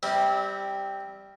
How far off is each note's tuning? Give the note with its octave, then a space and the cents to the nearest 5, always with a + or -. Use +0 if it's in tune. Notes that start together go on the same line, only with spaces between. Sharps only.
G3 +0 C4 +0 E4 -30